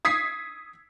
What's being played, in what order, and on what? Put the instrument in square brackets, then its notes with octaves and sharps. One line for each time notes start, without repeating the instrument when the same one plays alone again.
[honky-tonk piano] D#6 G#6 B6 C7